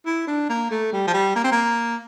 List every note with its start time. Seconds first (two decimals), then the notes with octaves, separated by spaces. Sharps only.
0.06 E4
0.27 D4
0.49 A#3
0.71 A3
0.93 G3
1.07 F3
1.14 G3
1.36 A#3
1.44 C4
1.52 A#3